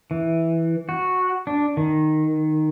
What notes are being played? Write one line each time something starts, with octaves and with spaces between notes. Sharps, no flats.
E3
F#4
D4
D#3